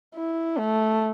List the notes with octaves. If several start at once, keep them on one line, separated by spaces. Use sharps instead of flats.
E4
A3